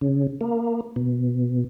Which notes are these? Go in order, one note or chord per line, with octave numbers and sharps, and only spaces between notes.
C#3
A#3
B2